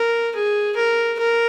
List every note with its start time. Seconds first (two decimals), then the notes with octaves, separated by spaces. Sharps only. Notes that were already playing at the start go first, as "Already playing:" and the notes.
Already playing: A#4
0.35 G#4
0.76 A#4
1.19 A#4